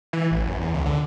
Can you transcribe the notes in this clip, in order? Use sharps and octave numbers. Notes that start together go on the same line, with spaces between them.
E3
A1
F#2
E2
C#2
D3